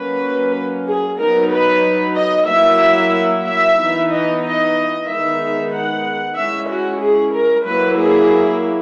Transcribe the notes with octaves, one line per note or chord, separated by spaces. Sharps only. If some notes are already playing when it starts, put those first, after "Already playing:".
Already playing: F#3 A#3 C#4 B4
G#4
F#3 B3 D#4 A#4
B4
D#5
F#3 A#3 E4 E5
E5
E3 B3 D#4
D#5
D#5
D#3 G#3 B3 D#4 E5
F#5
G#3 C#4 E4 E5
F#4
G#4
A#4
F#3 A#3 E4 B4
G#4